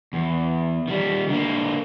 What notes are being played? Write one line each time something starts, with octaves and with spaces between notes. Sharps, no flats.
E2
D#3 G3
D3 A#3